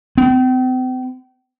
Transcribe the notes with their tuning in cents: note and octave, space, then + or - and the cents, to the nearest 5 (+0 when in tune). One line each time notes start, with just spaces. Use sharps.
C4 -40